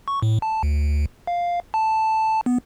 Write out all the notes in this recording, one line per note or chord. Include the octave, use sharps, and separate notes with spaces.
C#6
A2
A5
D2
F5
A5
B3